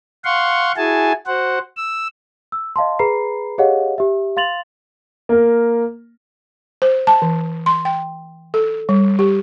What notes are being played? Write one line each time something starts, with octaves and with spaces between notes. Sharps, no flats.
F5 F#5 C6 C#6
E4 F#4 G#4 G#5 A5
F#4 C5 F#5
E6
E6
D#5 F5 A5 C6
G#4 B4 A#5 B5 C7
G4 G#4 C#5 D#5 F5 F#5
G4 E5
F5 C6 A6 F7 F#7
A#3 A#4
C5
A5
E3
C6
G5
A4
G3
G4